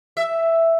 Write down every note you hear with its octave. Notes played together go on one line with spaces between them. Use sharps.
E5